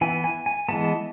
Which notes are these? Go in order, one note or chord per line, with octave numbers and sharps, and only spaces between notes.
E3 B3 G#5
G#5
G#5
E3 G#3 B3 A5